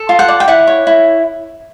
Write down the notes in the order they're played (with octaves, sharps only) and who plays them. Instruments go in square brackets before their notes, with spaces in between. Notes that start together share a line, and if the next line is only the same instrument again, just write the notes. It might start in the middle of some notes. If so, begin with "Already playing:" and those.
Already playing: [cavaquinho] A4
F4
F#5
D5
G5
E4 F#5
C#5
E4